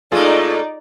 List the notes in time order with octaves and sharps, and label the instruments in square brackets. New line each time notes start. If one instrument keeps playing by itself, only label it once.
[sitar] A2 A3 A#3 [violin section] D#4 D5 [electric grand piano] F4 G#4 A4